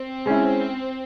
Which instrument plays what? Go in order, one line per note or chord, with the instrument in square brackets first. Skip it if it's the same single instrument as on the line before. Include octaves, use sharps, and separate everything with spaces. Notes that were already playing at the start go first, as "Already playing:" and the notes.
Already playing: [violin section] C4
[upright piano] G#3 C#4 E4